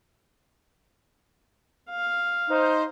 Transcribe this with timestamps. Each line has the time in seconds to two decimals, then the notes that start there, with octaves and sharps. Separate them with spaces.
1.90 F5
2.50 D#4 C5